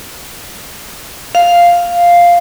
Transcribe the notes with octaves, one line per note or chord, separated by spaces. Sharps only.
F5